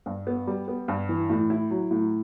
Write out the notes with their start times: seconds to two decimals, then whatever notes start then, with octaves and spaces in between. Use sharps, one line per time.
0.06 G2
0.27 B3
0.47 G3
0.68 B3
0.88 G2
1.09 E3
1.30 A2
1.50 E4
1.70 F#3
1.91 A2